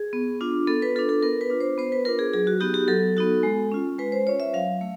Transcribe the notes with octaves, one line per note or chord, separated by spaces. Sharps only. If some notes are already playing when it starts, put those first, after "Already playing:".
Already playing: G#4
B3
D4 F4
B3 A4
B4
D4 F4 A4
A4
B3 A#4
B4
D4 F4
C5
B3 C5
B4
D4 F4 A#4
G#4
F#3 G#4
F#4
B3 D#4 F#4 G4
G4
F#3 A4
B3 D#4 F#4
G#3
C#4 F4
G#3 B4
C5
C#4 F4 C#5
E5
F#3 F5
A3